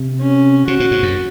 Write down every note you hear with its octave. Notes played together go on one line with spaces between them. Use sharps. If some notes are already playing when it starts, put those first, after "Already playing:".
Already playing: C3
C#4
C3 F#4
A#2
G#2
F#2